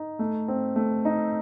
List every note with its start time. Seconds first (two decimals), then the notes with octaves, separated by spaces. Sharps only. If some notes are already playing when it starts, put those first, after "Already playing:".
Already playing: D#4
0.19 A3
0.48 C4
0.76 A3
1.05 D#4